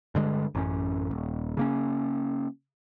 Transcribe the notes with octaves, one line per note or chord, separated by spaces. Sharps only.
G2 D3 G#3
A1 F#2 C#4
D#1
C#3 A#3 C#4